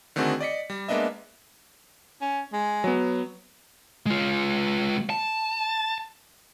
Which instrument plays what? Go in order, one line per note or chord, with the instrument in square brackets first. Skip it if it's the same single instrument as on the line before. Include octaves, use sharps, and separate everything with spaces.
[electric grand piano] D3 D#3 A3 C4 F#4 G#4
D5 D#5 B6 C#7
G3
G#3 A#3 B3 D4 D#5 E5
[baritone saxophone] C#4
G#3
[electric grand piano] F#3 B3
[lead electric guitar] G#3 F4
A5